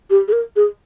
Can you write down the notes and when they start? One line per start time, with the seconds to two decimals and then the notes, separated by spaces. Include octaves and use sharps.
0.10 G4
0.28 G#4
0.32 A#4
0.56 G#4